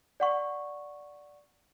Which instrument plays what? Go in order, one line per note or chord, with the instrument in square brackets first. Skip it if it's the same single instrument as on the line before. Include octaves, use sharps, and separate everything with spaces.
[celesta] D5 F#5 C#6